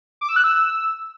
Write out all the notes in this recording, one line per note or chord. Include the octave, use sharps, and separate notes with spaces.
D6
E6
F#6
E6